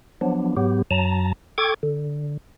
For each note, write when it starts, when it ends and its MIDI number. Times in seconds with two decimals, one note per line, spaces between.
0.21 0.55 53
0.21 0.55 54
0.21 0.55 59
0.21 0.55 62
0.57 0.82 44
0.57 0.82 54
0.57 0.82 59
0.57 0.82 67
0.91 1.33 42
0.91 1.33 54
0.91 1.33 81
0.91 1.33 82
1.58 1.74 69
1.58 1.74 79
1.58 1.74 85
1.58 1.74 86
1.58 1.74 92
1.83 2.37 50